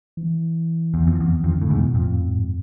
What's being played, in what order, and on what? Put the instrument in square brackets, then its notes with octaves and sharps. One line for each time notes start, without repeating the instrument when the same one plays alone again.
[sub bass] E3
[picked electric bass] E2
F2
E2
[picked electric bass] F2 [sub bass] D3
[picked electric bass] A2
[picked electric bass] E2 G#2 [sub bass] B2
[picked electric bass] F2 [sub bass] A2
[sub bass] G#2
G#2